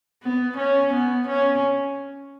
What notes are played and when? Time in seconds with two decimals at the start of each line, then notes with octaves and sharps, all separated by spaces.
0.23 B3
0.57 C#4
0.93 B3
1.28 C#4